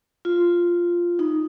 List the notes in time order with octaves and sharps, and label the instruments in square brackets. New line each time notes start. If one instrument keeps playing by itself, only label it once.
[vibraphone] F4
D#4